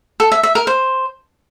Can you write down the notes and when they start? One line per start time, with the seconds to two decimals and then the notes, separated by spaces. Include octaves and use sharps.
0.20 A4
0.32 E5
0.43 E5
0.55 A#4
0.67 C5